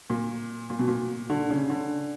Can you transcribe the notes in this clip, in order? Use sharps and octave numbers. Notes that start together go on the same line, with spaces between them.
A#2
A#2
B2
A#2
D3
C#3
D3